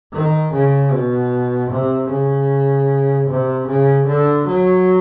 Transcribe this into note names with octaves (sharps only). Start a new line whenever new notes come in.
D#3
C#3
B2
C3
C#3
C3
C#3
D3
F#3